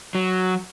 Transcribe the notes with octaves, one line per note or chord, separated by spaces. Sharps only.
F#3